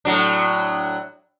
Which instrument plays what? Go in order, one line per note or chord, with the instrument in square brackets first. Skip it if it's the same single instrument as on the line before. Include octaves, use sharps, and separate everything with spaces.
[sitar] A2 F#3 D4